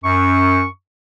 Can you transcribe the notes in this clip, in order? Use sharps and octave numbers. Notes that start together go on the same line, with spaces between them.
F#2 C#6